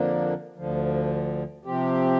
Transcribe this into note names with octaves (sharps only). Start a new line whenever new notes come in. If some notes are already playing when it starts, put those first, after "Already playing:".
Already playing: F2 D3 F3 A#3 D4
D2 D3 F3
C3 F3 C4 G4